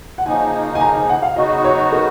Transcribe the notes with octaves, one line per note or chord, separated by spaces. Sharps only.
F#5
C#3 F3 A#3 D#4 G#5
G#5
A#5
G#5
F#5
F5
C#3 F#3 B3 D#4 F#4 D#5
C#5
A#4